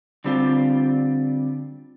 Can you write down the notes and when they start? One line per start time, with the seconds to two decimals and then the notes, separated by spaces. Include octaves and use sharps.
0.24 D3 G3 C4 F4